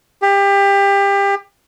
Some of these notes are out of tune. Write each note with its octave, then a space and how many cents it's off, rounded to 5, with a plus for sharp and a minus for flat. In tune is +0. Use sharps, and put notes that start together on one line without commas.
G4 +25